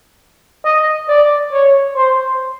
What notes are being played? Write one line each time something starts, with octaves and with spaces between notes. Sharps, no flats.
D#5
D5
C#5
C5